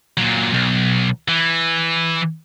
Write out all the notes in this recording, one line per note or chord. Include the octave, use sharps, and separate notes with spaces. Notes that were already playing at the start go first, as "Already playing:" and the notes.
A#2 F#3
B1
E3